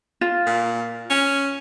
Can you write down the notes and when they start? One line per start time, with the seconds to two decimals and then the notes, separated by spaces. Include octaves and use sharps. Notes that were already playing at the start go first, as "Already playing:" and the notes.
0.21 F4
0.47 A#2
1.10 C#4